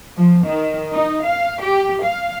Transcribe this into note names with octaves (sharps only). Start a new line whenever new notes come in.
F3
D#3
D#4
F5
G4
F5